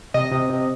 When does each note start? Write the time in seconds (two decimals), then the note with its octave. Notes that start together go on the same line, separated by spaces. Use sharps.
0.14 C3 D#5
0.32 C3
0.50 C3